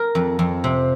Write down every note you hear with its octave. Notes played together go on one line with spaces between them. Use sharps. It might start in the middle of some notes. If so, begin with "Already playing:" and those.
Already playing: A#4
F2
F2
C3